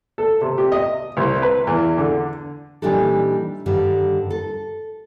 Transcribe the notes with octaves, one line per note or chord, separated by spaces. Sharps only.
A4
C3
G4
D#5
C2
B4
E2
D3
A#2 E3 G3 D4 D#4 A4
G2 D3 D#3 G3
A4